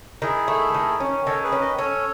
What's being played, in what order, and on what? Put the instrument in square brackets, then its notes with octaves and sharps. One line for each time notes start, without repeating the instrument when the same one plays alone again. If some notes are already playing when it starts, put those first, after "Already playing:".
[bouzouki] D#3 [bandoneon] E4 G#4
[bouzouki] A3
D#3
C#4
[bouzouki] D#3 [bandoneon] A4 C#5
[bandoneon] G#4 B4
[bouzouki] C#4
[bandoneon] B4 D#5
[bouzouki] C#4 [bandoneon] A4 C#5